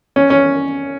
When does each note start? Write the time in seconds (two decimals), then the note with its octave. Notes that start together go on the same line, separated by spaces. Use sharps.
0.16 C#4
0.30 C#4